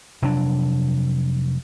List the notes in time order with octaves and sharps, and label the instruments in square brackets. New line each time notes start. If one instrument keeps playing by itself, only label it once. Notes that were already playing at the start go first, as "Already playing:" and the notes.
[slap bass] F1 C3 F#3 D4